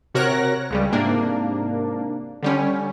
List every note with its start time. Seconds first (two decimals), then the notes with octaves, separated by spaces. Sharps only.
0.15 C3 F#4 A#4 C#5 F#6 A#6
0.70 C#2 C#3 G3
0.92 G#2 C3 A#3 D4
2.43 D3 G3 C#4